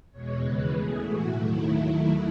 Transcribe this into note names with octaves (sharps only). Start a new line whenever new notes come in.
E2 B2 G#3 C#5
D#2 C#3 E3 G#3 B4
B2 A3 G#4
A2 E3 A3 F#4
D#2 D#3 F#3 A3 E4